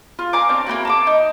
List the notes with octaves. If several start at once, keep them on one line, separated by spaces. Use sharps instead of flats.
F4
F5 G#5 A#5 D6
C4 D4 C#5
A#3 B3 E4 F#4
A5 B5 D6
D#4